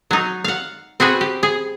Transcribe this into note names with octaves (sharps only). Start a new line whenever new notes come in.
F#3 D#4
F5 F#5
C4 F#4 G#4 B4
G4
G#4